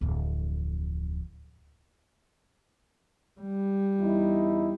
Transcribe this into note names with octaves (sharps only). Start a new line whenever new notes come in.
D1 F2
G3
E2 D#4 E4